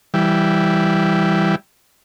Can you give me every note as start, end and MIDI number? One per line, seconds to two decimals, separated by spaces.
0.14 1.55 52
0.14 1.55 55